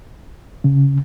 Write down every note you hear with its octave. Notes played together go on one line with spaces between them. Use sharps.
C#3